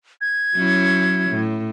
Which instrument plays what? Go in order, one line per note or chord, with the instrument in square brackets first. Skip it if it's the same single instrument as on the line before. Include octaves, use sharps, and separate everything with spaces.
[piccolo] G#6
[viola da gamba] F#3 C#4 E4
A2